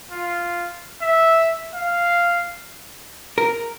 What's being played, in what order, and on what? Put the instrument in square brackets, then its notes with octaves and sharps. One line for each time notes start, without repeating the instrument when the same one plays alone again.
[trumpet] F4
E5
F5
[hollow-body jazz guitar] A#4